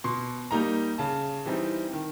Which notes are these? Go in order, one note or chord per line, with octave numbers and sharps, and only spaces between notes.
B2 C6
G3 A#3 D#4 A#5
C#3 A5
E3 G3 C4 D#4
D#3